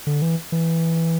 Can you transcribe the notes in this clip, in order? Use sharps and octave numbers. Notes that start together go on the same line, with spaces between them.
D3
E3
E3